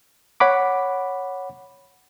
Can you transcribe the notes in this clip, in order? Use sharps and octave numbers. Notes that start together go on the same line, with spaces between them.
C#5 F#5 B5 D6